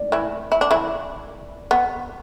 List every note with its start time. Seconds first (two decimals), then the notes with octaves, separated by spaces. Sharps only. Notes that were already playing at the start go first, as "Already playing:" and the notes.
Already playing: D5
0.12 E3 E4
0.52 E4
0.61 D4
0.71 E3 E4
1.71 B3